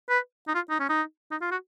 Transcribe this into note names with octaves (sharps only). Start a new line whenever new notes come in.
B4
D#4
F4
D#4
C#4
D#4
D#4
F4
F#4